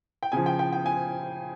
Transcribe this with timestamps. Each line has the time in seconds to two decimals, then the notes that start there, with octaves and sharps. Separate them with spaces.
0.23 G5
0.32 C#3 F3 G#5
0.46 G5
0.59 G5
0.73 G5
0.86 G#5